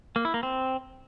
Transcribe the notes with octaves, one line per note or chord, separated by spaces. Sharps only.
A#3
E4
A#3
C4